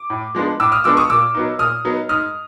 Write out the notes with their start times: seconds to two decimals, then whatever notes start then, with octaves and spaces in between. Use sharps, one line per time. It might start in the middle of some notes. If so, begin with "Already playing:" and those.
Already playing: D6
0.10 A2
0.35 F3 G#3 B3 D4
0.60 A2 D6 E6
0.72 D#6 F6
0.84 F3 G#3 B3 D4 D6 E6
0.97 C#6 D#6
1.10 A#2 D6 E6
1.34 F#3 B3 D#4
1.59 A#2 D#6 F6
1.85 F#3 B3 D#4
2.09 G#2 D#6 F6